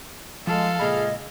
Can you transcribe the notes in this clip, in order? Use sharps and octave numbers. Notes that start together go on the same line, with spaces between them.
F3 G#3 A4 F5 A5
C#2 A#2 G#4 D#5 B5